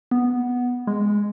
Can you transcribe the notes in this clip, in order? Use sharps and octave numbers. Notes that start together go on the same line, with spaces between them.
B3
G#3